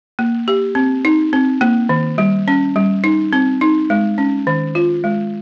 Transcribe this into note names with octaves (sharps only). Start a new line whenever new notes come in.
A#3
G4
C4
D#4
C4
A#3
D#3
G3
C#4
G3
D#4
C4
D#4
G#3
C#4
D#3
F4
G#3